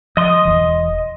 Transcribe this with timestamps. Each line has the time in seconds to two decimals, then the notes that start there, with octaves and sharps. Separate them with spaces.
0.17 F3 D#5 C6 D#6
0.45 E1 B1 E3